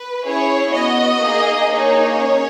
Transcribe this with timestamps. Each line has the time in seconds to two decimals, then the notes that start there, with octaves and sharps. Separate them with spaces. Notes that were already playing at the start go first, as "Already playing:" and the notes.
Already playing: B4
0.23 C#4 E4 G#4 C#5
0.72 B3 F#4 D#5
1.20 A#3 D#4 G#4
1.69 A#3 D#4 G#4 C#5
2.18 C#4